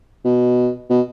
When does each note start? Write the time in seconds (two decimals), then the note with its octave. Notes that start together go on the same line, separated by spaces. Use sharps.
0.25 B2
0.90 B2